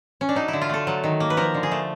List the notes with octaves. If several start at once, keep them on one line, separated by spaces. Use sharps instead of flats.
C#4
D4
F#3 D#4
E4
D3
F4
A3 A4
F#3
D#3
A#3
B4
F3 A#4
D3
G#4
A3